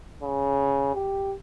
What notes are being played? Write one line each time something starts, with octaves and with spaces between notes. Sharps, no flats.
C#3
G4